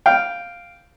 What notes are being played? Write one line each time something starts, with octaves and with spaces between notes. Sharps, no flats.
F5 G5